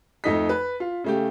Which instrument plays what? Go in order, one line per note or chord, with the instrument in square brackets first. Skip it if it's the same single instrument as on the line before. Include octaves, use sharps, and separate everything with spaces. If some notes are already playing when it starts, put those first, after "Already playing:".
[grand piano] F2 A3 D#4 D#5 B6
B4
F4
C#3 A3 G4